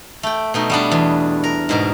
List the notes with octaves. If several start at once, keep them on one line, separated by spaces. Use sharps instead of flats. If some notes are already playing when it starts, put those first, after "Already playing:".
A3 G5
B2 A3 D#4
G3 B3 D4
E2
A#4
G#2 B2 A#4